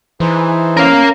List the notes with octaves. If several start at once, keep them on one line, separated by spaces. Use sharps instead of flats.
E3 D#4 G#4 C5
C#4 A#4 F5